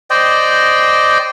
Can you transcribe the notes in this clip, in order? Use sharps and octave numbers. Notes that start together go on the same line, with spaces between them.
C5 D5 D#5 G5